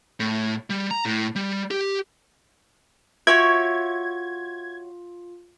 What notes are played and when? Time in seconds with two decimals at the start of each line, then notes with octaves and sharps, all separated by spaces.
0.20 A2
0.70 G3
0.91 A#5
1.05 A2
1.35 G3
1.71 G4
3.27 F4 F#4 C#5 E5 G#6